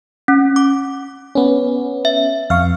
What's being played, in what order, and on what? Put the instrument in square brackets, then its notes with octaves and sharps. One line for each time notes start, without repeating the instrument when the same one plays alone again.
[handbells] C#4
D6
[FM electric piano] B3 C#4
[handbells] E5
[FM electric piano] F2 F5 C#6 [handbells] F6